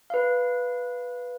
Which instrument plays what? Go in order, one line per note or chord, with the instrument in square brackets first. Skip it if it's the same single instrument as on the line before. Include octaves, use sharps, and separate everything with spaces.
[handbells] B4 F5